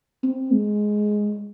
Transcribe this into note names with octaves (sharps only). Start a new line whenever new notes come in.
C4
G#3